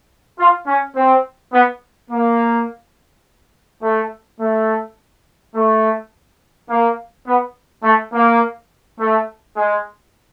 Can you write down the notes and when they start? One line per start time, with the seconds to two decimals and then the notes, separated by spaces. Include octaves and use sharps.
0.39 F4
0.67 C#4
0.96 C4
1.53 B3
2.10 A#3
3.83 A3
4.40 A3
5.55 A3
6.70 A#3
7.27 B3
7.84 A3
8.13 A#3
9.00 A3
9.57 G#3